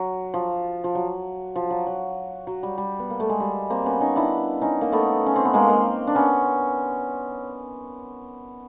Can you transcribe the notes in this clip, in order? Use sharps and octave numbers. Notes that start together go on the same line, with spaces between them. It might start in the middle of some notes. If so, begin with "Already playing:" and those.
Already playing: F#3
F3
F3
F#3
F3
F#3
F#3
F#3
G3
G3
B3
A#3
A3
G#3
G3
A#3 C4
B3 C#4
C#4 D#4
D4 E4
C#4 D#4
A#3
A3 B3
C#4
C4
B3
G#3 A#3
A#3 C4
D4
B3 C#4